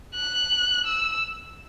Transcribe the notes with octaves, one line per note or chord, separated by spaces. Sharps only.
F#6
E6